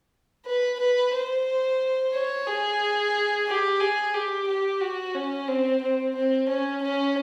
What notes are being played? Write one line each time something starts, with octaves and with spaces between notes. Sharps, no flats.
B4
B4
C5
C#5
G#4
G4
G#4
G4
G4
F#4
C#4
C4
C4
C4
C#4
C#4